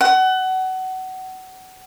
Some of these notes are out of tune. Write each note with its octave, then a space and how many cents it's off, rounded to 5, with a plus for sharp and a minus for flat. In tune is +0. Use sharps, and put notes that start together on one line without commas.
F#5 +25